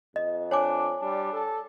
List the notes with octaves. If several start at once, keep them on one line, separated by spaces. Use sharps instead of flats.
F2 D#5
D4 C#5 G#5 D6
G3 D4
A4